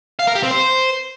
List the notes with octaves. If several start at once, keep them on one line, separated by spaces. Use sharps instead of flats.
F5
A#4
G4
C4
C5